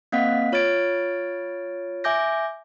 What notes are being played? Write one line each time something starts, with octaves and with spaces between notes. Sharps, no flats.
A#3 C4 D#5 F5 F#5 B6
F4 C#5 F6 G#6 A6 D7
E5 G#5 D6 G6 A#6